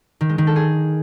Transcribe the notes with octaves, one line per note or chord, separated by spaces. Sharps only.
D#3
G#3
D#3
A4
G#4